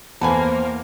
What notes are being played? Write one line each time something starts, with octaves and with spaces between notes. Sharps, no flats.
E2 A#3 A4 B4 C5 G#5